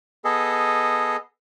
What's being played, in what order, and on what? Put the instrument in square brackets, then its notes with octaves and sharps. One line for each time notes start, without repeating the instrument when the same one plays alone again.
[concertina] B3 G#4 A4 D#5